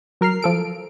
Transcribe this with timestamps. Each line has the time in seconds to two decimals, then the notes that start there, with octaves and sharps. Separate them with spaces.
0.21 F#3 A#4 F6 C7
0.42 F3 A4 D7